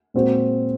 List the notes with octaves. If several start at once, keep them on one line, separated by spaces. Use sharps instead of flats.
A#2 G#3 C4 F#4 C5